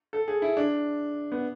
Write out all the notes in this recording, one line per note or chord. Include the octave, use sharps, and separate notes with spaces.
A4
G#4
E4
D4
B3